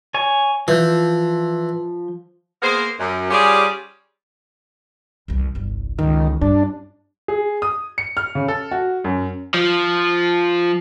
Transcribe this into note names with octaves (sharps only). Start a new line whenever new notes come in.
C#5 G#5
E3 F3 G6
A#3 B3 G#4 A#4 C5
F#2
G3 C#4 F4 G4 G#4 D5
F1 C2
G1 C2
C#2 D#3
G2 D4
G#4
D#6
C#7
F6
C#3
A4
F#4
F#2
F3